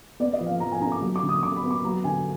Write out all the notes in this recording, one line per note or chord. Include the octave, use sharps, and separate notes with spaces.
B3 D5
D#5
F3
F5
F3 A#5
G#5
D4 A#5
D6
F#3
D6
D3
D#6
D3 D6
B5
B3
D6
F#3 A#5
D3 G#5